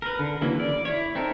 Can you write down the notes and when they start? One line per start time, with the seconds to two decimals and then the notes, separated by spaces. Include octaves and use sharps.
0.02 A#4 B4
0.19 D3
0.41 C#3 E3 F#3 A#3 E4
0.60 D5
0.85 E4 C#5
1.15 C4 D#4 A4 A#4